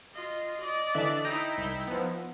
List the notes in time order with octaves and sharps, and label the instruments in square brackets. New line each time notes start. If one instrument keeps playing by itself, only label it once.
[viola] F4 D#5
D5 D#5
[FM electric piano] D3 E3 F#6 [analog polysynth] E5 A5
[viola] D#4 E4 [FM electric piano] G5 A#5 [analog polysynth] D#6
[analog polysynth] C2 G6
F3 B3